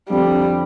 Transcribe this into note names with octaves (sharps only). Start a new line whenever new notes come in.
F2 D3 F3 G3